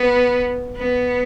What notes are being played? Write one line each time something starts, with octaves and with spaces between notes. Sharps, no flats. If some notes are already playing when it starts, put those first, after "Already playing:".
Already playing: B3
B3